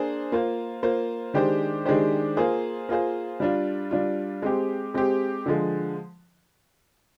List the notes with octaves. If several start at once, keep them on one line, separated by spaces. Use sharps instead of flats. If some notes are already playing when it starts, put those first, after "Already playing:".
Already playing: A#3 D4 G#4 C5
A#3 F4 C5
A#3 F4 C5
D#3 G#3 D4 G4 C5
D#3 G#3 D4 G4 C5
A#3 F4 G#4 C5
A#3 F4 G#4 C5
G3 D4 F4
G3 D4 F4
G#3 C4 G4
G#3 C4 G4
D3 F3 G#3